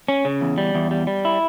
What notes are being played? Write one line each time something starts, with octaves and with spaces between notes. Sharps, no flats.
C#4
C#3
E2
G3
E2
G3
G3
E4